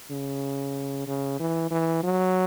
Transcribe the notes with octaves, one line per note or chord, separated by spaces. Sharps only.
C#3
C#3
E3
E3
F#3